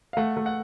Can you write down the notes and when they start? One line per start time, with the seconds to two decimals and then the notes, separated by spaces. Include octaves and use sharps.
0.13 F5
0.17 A3 F#5
0.37 A3
0.46 F#5